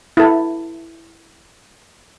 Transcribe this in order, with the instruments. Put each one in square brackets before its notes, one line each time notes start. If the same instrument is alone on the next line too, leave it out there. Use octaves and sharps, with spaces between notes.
[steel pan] E4 A4